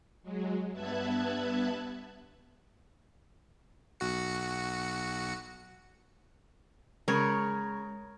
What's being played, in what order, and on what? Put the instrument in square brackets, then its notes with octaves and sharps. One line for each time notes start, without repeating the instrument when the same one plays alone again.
[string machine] F#3 G#3
G2 B3 E5 A5 F#6 G#6
[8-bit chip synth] B1 F#4 C#7
[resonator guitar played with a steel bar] C#3 [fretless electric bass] G#3 [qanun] A#4 C#5